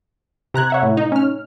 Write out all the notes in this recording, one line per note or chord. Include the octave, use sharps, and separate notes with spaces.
C3 A#5 F#6 G#6
C#5 E5 F#5
A2
D#4
C#4 F6